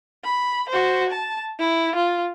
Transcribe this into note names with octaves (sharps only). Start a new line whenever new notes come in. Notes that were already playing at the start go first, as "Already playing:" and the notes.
B5
F#4 C5
A5
E4
F4